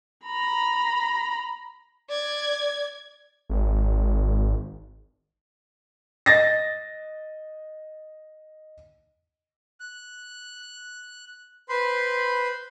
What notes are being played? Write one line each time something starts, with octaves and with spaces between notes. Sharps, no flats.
A#5 B5
D5 G#6
G#1
D#5 A6 A#6
F#6
B4 C5 B5 C6